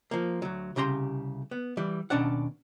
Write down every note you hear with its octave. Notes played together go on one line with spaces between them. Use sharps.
F3 A#3
D2 F#3
C2 C#3 G4 A#5 C6
B3
E3 G3
D#2 B2 C#4 D4 D5 F#5